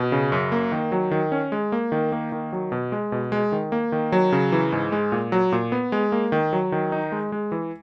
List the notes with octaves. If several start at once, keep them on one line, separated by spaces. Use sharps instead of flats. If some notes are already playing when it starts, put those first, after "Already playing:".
Already playing: B2
C#3
F#2
A#3
D#3
F#3
D#3
C#4
G#3
A#3
D#3
A#3
D#3
F#3
B2
G#3
B2
G#3
D#3
A#3
D#3
F#3
C#3
E3
G#2
G#3
A#2
F#3
A#2
B3
G#3
A#3
D#3
F#3
D#3
D#4
G#3
G#3
E3